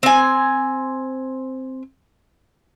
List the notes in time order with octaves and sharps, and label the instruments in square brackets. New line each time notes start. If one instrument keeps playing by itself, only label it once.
[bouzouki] C4 G#5